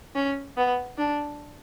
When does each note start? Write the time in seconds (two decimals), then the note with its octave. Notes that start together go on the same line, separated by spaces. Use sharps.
0.15 C#4
0.57 B3
0.98 D4